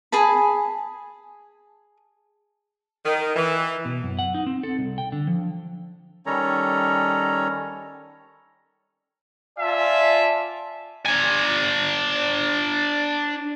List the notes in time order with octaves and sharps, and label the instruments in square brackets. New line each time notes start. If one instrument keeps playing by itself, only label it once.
[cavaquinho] G#4 G#5 A5 B5
[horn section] D#3
E3
[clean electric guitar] B2
F#2
F#5
D#4
C4
A4
C2
G5
D3
F3
[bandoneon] D#3 G3 C#4 A4 C#5 A#5
[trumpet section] F4 D5 E5 G#5 A5
[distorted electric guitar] D4 G#5